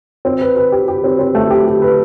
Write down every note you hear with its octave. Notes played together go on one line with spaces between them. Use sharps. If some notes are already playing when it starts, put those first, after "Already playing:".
C4
B4
B4
G4
G4
C4
C4
A3
G4
G4
B4